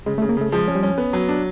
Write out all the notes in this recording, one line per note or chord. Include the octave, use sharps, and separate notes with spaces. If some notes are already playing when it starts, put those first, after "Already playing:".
C#3 G#3
A3
C#3
A#3
C#3 A3
F3 G#3
C#4
G3
C#4
B3
F#3
D4